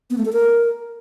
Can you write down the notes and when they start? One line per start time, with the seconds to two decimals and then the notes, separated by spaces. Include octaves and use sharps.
0.10 B3
0.18 A3
0.25 A4
0.33 A#4